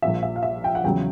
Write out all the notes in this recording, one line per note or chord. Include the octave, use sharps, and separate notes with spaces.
A#1 A#2 F3 E5
E5
F5
E5
G5
F#5
E2 C#3 F#3 G5